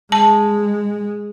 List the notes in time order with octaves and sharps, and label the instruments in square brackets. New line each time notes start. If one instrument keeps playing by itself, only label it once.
[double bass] G#3 [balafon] A5